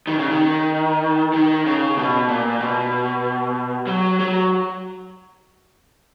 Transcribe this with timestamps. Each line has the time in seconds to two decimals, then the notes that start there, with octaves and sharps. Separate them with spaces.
0.07 D#3
0.19 C#3
0.29 D#3
1.34 D#3
1.66 C#3
1.97 B2
2.29 A#2
2.61 B2
3.87 F#3
4.19 F#3